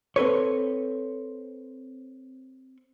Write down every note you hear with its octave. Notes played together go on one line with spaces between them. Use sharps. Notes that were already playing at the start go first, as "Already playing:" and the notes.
C4 A4 B4 C#5